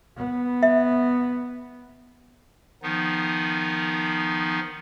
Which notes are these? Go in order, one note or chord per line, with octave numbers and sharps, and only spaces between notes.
B3
E5
D#3 F3 B3 D#4